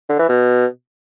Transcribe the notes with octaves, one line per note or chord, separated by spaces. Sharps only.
D3
E3
B2